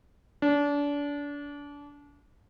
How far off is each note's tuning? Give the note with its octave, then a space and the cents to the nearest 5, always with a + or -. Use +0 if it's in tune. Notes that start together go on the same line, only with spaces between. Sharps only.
D4 -30